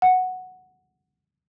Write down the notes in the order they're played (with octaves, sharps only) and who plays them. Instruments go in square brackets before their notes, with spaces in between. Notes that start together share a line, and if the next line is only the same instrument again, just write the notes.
[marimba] F#5